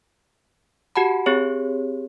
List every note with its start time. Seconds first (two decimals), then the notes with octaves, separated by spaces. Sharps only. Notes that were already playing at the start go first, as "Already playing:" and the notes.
0.96 F#4 G4 F#5 A5 B5
1.26 C4 G4 G#4 C#5